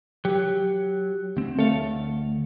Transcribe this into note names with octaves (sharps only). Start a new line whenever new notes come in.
F#3 G4
D2 C4
A3 A4 C#5 F5
D2